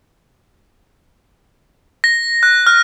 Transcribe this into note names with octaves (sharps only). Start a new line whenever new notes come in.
A#6
F#6
F6